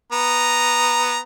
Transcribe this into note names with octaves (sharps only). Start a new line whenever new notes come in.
B3 A#5